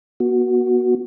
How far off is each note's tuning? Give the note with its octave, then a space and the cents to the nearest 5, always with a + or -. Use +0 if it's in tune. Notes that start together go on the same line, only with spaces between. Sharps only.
B3 -40 F#4 +0